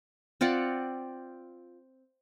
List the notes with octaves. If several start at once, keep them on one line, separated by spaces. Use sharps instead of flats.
C4 F4 D5 F#5